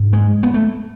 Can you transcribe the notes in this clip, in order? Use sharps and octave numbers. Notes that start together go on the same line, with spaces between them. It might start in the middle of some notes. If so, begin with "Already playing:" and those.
Already playing: G#2
G#3
B3
A3